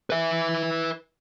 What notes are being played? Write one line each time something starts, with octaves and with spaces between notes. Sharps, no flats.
B4 E5